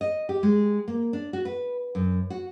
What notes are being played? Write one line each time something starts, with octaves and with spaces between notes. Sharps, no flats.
D#5
G4
G#3
A#3
D4
F#4
B4
F#2
F#4